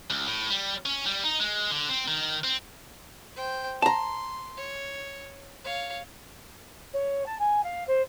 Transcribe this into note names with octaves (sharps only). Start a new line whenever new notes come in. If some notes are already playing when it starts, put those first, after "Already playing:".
C#2
A2
G3
C#4
G3
D#4
G#3
D3
C4
D#3
C4
C5 G5
A5 A#5 C6
C#5
C#5 F5
C#5
A5
G#5
F5
C5